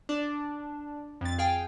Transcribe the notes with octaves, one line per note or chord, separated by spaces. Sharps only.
D4
F2 A6
G#4 F5 G5